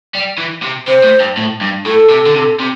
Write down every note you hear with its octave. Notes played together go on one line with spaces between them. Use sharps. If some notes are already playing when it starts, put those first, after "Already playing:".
G3
E3
C3
C3 C5
A2
G2
A2
G2
A2 A4
C3
D3
C3
C3